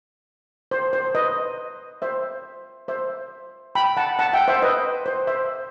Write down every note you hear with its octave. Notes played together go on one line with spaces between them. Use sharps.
C5
C5
B4 D#5
C5 E5
C5 E5
G5 B5
F#5 A5
F#5 A5
E5 G5
C5 E5
B4 D#5
C5
C5 E5